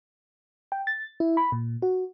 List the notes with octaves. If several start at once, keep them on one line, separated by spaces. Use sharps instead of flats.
G5
A6
E4
B5
A#2
F#4